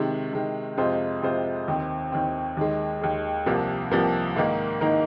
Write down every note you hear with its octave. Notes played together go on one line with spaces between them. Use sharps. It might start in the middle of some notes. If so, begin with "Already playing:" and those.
Already playing: C3 D#3 G#3
C3 D#3 G#3
F2 C3 G#3 F4 C5
F2 C3 G#3 F4 C5
D#2 D#3 C4
D#2 D#3 C4
D#2 D#3 G#3
D#2 D#3 G#3
C2 C3 F3 A#3
C2 C3 F3 A#3
G#2 D#3 A#3 D#4 A#4
D#3 A#3 D#4 A#4